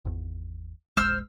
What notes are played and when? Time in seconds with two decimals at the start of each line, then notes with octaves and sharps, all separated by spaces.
0.05 G#1 E2
0.97 E1 A#1 G#3 C5 E6 F6